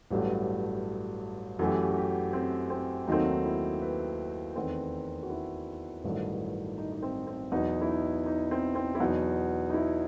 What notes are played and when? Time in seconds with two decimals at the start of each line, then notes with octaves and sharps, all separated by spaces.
0.11 A1 G2 F#3 A3 G4
1.59 F#2 E3 A3 F#4
1.67 G4
1.75 F#4
1.83 G4
1.90 F#4
1.98 G4
2.06 F#4
2.33 C4
2.70 C4
3.07 D#2 D#3 F#3 A3 C4 D#4
3.26 D#4
3.45 E4
3.82 B4
4.56 E2 D#3 A3 C4
5.23 F#4
5.30 E4
6.04 A1 G2 D#3 F#3 A3
6.78 D#4
6.92 D#4
7.02 C4
7.27 C4
7.52 E2 B2 F#3 D#4
7.81 E4
7.89 D#4
8.26 D#4
8.51 C4
8.75 C4
8.95 E4
9.00 E2 B2 F#3 D#4
9.70 D#4
9.74 E4